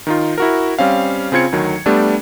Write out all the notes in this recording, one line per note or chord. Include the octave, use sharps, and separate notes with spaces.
D#3 D#4 F4
E4 F#4 A#4
G3 C4 C#4 F5
C#3 C4 F4 G#6 C#7
D2 D#3 F#3
G3 A3 B3 D4 G4